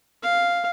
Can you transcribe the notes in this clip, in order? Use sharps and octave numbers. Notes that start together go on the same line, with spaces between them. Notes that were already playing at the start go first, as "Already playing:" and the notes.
F5